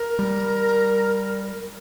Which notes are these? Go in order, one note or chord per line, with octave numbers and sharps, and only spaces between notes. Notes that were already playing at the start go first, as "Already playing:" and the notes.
Already playing: A#4
G3